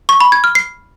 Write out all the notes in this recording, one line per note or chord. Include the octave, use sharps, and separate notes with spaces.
C#6
B5
G#6
F6
C7